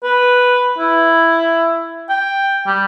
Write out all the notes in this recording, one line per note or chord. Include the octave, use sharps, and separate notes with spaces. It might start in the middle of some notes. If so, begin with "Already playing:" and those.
B4
E4
G5
G3